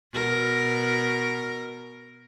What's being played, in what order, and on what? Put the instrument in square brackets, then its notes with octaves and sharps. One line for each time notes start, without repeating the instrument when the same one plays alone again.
[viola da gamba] B2 A#4